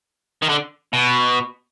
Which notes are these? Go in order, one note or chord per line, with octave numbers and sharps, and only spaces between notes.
D#3
D3
B2